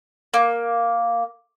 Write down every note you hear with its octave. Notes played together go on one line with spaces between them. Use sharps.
A#3